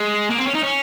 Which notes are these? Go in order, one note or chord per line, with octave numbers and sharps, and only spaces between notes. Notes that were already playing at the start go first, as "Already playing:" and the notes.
Already playing: G#3
A#3
C4
C#4
D#4
C#4